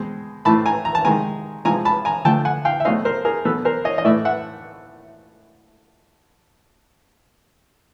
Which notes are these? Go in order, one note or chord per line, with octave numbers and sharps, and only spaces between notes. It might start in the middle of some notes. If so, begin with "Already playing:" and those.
Already playing: B2 G#3 C4
A2 E3 A3 C4 A5 B5
G#5 A#5
A#5
A5
C3 D#3 G#3 G#5 A#5
C3 F3 G#3 G#5 A#5
A5 B5
G#5 A#5
D3 F3 A3 G5 A5
F#5 G#5
F5 G5
E5
B2 F#3 A3 C4 D#5 F5
A#4 C5
G#4 A#4
B2 F#3 B3 A4 B4
A#4 C5
C#5 D#5
D#5
A2 E3 A3 D5 E5
E5 F#5